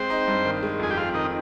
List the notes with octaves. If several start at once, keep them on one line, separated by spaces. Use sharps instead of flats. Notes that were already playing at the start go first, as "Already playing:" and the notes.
Already playing: G#3 C4 C5
D#4
G2
D#3
G#3
F2 G#4
G4
C4 F4
D#3 D#4